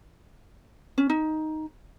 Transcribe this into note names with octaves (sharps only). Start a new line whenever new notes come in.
C#4
D#4